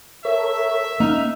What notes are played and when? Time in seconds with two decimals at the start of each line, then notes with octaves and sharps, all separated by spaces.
0.25 A4 A#4 C#5 E5
1.00 A#3 C#4 D#4 F6